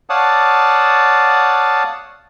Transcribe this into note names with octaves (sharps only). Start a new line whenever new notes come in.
C#5 D5 F5 F#5 A5 D#6